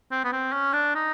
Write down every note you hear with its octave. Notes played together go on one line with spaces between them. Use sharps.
C4
B3
C4
C#4
D4
D#4